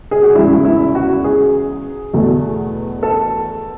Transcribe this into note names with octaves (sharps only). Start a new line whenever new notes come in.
G#4
F#4
E2 C#3 G#3 E4
E4
F#4
G#4
E2 B2 A3
A4